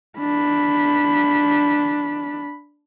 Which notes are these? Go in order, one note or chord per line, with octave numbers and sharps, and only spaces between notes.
D4 B5